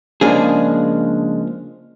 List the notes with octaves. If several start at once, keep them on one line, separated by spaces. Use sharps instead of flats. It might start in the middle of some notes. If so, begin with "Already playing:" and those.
C#3 F3 G#3 A#3 D4 G#4